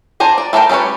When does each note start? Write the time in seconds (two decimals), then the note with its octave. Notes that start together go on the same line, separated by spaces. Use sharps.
0.20 D4 C5 G#5 A#5
0.38 D5
0.53 E3 A3 D4 A#4 G5
0.69 G3 C#4 G#4 B4 C#5